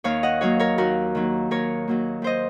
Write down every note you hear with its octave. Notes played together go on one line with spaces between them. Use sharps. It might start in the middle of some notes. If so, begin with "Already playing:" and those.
D#2 C#5 F5
D#5 F#5
D#3 F#3 A#3 C#5 F5
A#4 C#5
D#2 F#4 A#4
D#3 F#3 A#3
D#2 A#4 C#5
D#3 F#3 A#3
D#2 C5 D#5